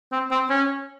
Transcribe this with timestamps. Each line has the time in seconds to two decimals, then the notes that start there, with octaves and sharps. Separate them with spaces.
0.12 C4
0.31 C4
0.50 C#4